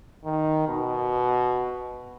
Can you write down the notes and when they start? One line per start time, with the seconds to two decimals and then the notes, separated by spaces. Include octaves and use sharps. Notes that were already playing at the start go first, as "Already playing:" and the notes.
0.25 D#3
0.68 B2